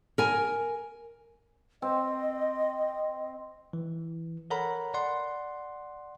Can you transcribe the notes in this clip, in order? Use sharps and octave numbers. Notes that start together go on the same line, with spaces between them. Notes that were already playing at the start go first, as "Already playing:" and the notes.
A#4 G#5
C4 D#5
E3
A4 A#4 C#5 F#5 A#5 B5
D5 F#5 C6